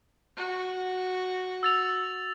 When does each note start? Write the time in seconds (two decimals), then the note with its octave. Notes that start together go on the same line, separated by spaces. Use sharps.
0.37 F#4
1.63 E6 A6 F7